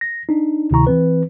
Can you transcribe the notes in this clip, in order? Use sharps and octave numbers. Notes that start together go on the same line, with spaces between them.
A#6
D4 D#4
D2 C3 D#3 E4 A#5 C#6
E3 C4 B4